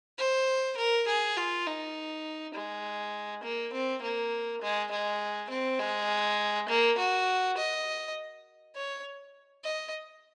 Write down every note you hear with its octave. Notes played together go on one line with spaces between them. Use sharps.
C5
A#4
G#4
F4
D#4
G#3
A#3
C4
A#3
G#3
G#3
C4
G#3
A#3
F#4
D#5
C#5
D#5